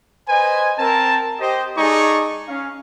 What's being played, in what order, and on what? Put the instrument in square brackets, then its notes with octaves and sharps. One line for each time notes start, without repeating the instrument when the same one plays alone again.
[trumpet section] B4 C5 D#5 G#5
C4 A#4 A5
G4 C5 D#5
G#3 D#4 G#4 A4 D5 C#6
C#4 F5